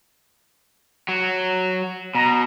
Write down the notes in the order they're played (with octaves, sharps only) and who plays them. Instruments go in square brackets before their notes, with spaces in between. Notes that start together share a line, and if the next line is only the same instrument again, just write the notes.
[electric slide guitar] F#3
[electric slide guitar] B2 [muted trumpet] A#5